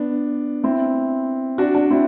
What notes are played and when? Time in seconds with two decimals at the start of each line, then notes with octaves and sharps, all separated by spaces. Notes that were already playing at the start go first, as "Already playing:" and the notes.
Already playing: B3 D4
0.64 C4 E4
1.58 D4 F#4
1.75 D4 F#4
1.91 C4 E4